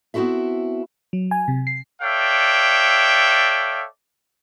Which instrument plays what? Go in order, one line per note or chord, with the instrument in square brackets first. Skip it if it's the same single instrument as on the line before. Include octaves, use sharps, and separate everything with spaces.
[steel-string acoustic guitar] B3 C4 E4 F#4 A4 E5
[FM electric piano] F#3
G#5
C3
C7
[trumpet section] A4 C#5 D5 E5 F5 G5